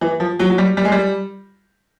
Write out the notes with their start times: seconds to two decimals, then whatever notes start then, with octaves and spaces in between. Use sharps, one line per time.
0.01 E3
0.20 F3
0.39 F#3
0.50 F#3
0.58 G3
0.77 G3
0.85 G#3
0.92 G3